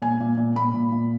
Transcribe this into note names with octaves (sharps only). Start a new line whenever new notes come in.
A#2 G#5
A#2
A#2
A#2 B5
A#2
A#2